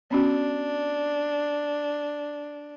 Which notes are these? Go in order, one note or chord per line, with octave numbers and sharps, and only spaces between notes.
B3 C#4 D4 F#4